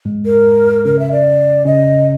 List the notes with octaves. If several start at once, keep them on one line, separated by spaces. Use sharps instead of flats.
G#2 G#3
A#4
C#3 C#4 A#4
E5
D5
C#3 C#4 D#5